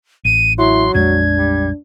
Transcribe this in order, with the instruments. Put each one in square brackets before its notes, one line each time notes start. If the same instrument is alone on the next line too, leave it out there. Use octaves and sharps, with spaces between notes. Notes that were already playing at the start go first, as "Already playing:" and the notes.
[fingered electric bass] A1 [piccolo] D#7
[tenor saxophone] F#3 [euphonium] E4 [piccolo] C6
[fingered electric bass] A#1 F2 G#3 [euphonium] D4 [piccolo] G#6
[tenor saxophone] G3